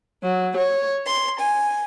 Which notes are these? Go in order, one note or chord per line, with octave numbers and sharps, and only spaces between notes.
F#3
C#5
C6
G#5